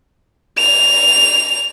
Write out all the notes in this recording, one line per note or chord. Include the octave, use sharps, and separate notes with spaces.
F7